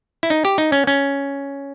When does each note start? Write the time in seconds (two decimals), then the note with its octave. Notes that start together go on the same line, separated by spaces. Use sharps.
0.23 E4
0.30 D#4
0.45 G4
0.58 D#4
0.72 C#4
0.87 C#4